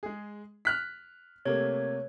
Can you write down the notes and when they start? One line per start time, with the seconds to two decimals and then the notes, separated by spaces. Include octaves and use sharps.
0.03 G#3 G#4
0.65 F6 F#6 B6
1.45 C3 A3 A#3 C#5 G#6